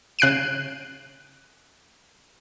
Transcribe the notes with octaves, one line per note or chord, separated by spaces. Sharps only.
C#3 F#6 C7 D7 D#7